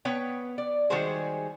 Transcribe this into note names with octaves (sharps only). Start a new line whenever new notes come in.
B3 B4 C#5 G5
D5
D#3 G3 G#3 F#4 G#4 C5